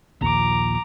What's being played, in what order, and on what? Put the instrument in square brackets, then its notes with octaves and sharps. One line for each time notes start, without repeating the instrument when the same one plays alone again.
[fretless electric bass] A#1 D#2 A#2 [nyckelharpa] A#5 D6